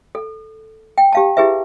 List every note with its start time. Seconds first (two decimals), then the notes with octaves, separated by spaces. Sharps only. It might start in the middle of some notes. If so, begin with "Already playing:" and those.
0.15 A4
0.98 G5
1.13 G4 F5 A5
1.37 E4 G4 G#4 B4 E5